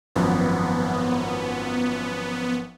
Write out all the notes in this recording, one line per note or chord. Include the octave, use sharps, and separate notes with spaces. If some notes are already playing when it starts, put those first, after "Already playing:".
G#1 F#2 F3 B3